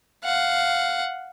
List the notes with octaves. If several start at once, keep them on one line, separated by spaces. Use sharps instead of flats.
F5 F#5